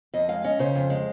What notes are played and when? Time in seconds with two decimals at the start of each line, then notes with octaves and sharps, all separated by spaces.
0.14 F2 D#5
0.28 G#3 F5
0.44 C#4 D#5
0.59 C#3 C5
0.75 F2
0.90 G#3